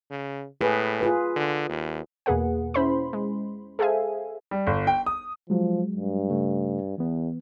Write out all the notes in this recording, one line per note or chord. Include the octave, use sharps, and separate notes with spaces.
C#3
A2 G#4 B4
F4 G#4 B4
D3
D#2
E2 B2 A#3 G#4 B4 F#5
C#4 E4 C5 B5 C6
G#3
G#4 A4 C5 E5 F5 G#5
G3
G1
G5
D#6
F3 F#3 G#3
G2
C#3 A3
E2 E3 B3